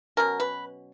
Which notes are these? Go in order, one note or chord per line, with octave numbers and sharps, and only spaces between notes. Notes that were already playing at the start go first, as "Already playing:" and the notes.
B2 F#3 C#4 A#4
B4